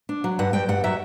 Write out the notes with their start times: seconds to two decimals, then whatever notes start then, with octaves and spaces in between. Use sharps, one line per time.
0.09 D4
0.24 F#3
0.39 G2 F#5
0.53 G2 G5
0.69 G2 F#5
0.84 F#3 E5